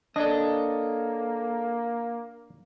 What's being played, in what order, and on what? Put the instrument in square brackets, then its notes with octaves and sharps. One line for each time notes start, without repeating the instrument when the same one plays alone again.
[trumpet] A#3 [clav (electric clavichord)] D4 [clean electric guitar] A4 C#5 D#5